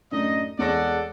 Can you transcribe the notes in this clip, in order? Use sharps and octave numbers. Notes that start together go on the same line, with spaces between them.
F#2 A2 D4 D#4 D#5
E2 G#3 A4 C#5 D5 F#5 A#6